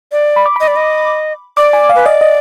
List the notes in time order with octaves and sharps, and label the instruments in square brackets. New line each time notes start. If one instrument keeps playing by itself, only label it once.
[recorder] D5
[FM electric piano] B5
D6
[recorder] D#5 [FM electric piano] B5
[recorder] D5
D#5
[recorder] D5 [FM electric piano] D6
[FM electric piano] G#5
F5
[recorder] B4
[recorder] D5 [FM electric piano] D#5
[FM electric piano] D#5